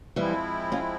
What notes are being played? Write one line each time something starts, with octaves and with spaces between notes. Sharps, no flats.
E3 F3 G3 G#3 C4 E4
C#4 F4